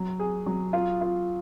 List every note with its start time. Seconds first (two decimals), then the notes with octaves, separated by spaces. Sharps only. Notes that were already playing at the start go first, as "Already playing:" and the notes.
Already playing: F#3
0.19 G#4
0.46 F#3
0.73 F4
1.01 F4